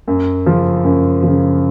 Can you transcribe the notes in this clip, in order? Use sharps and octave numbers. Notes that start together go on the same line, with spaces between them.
F#2
C#3 F3
F#2
C#3 F3